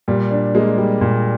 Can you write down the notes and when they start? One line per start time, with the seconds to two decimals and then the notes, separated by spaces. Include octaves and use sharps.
0.08 A#2 G3
0.31 D4
0.55 G#3 A#3
0.78 G3
1.01 A#2